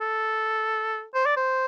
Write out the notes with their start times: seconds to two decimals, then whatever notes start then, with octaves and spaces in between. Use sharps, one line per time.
0.01 A4
1.15 C5
1.26 D5
1.37 C5